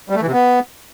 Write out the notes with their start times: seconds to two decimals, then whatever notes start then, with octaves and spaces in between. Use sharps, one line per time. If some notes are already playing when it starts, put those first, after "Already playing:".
0.10 G3
0.15 A3
0.21 E3
0.27 C3
0.33 B3